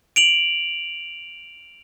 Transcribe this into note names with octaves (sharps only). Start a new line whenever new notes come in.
D7 F7 F#7